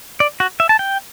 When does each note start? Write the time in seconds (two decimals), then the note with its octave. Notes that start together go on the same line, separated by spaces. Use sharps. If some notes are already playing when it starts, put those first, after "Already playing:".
0.20 D5
0.40 F#4
0.60 E5
0.69 A5
0.79 G5